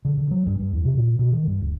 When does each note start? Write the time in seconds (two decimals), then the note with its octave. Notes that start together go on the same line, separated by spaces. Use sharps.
0.05 D3
0.17 D3
0.31 F#3
0.47 G2
0.59 G2
0.73 E2
0.85 C3
0.97 A#2
1.19 B2
1.32 D#3
1.47 G2
1.61 D1